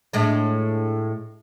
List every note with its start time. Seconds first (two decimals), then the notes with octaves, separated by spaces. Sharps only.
0.13 A2 G#3 D4